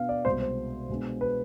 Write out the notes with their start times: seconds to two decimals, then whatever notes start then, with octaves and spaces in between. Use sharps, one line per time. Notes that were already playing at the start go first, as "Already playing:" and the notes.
Already playing: B2 B3 D4 F5
0.09 D5
0.25 C2 B2 G#3 C5
0.42 C5
0.89 B2 G#3 B3 D4
1.21 B4